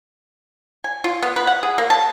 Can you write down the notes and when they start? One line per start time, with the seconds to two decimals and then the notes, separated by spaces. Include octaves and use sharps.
0.84 G#5
1.04 F4
1.22 B3
1.36 B4
1.47 F#5
1.63 G#4
1.78 A#3
1.90 A5